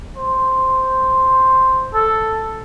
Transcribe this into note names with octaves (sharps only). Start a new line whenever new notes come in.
C5
A4